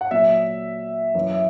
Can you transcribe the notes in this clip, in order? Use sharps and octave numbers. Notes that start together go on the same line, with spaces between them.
F#5
A#2 F#3 E5
F#2 E3
E5